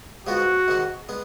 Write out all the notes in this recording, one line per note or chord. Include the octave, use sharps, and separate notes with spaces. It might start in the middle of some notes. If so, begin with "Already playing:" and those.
G#2 F3 G#3 B3 F4 F#4
G#2 D#3 G#3 D#4
G#3 B3